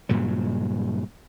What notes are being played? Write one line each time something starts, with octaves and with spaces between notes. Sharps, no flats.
G2 A#2 C#3 F#3